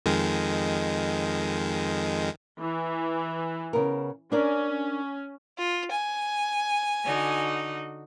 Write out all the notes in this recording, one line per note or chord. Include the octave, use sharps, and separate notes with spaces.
F2 D#3 G#3
E3
C#3 B3 A#4
C#4 D4 A#4 D5
F4
G#5
D3 D#4 F#4